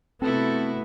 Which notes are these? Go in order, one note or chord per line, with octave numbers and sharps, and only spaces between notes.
C3 A3 B3 C4 E4 F#4 A4